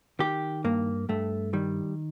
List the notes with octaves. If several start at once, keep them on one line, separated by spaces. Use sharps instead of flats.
D#3 G4
G2 A#3
G2 A3
D#3 G3